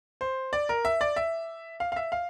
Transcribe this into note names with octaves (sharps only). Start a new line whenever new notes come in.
C5
D5
A#4
E5
D5
E5
F5
F5
E5
F5